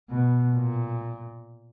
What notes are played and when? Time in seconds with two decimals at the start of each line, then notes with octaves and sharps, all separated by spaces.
0.10 B2
0.55 A#2